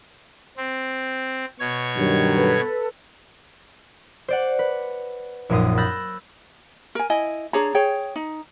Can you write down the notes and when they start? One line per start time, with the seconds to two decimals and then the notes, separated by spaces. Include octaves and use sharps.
0.57 C4
1.59 B2 C#5 G#6
1.96 G2 D#3 F#3
2.36 A4 B4
4.28 C5 D5 F#5
4.59 B4
5.49 A#1 F#2 A#2 D#4 C6 D#6
5.78 B5 E6 F#6 G6 A6 A#6
6.95 A#4 G#5
7.10 E4 D#5 G#5
7.53 D4 G#4 C#5 A#5
7.74 G#4 C#5 G5
8.16 D#4